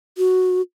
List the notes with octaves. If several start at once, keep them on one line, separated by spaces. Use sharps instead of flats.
F#4